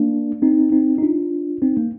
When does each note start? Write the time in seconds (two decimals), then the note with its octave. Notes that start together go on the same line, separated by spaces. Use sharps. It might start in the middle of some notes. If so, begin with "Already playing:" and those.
Already playing: A#3 D4
0.42 C4 D#4
0.72 C4 D#4
0.98 D#4
1.02 D4 F4
1.62 C4 D#4
1.77 A#3